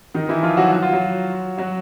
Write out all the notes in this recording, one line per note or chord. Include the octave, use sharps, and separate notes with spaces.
D#3 D#4
E3 E4
F3 F4
F#3 F#4
F#4
F4
F#3 F#4
F#3 F#4